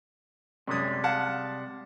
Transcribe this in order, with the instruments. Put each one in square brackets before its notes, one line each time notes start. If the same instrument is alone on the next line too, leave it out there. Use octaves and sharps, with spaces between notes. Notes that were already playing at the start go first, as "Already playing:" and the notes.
[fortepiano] F#2 D#6 [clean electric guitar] C3 G3 G#3
[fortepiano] F5 F#5 A5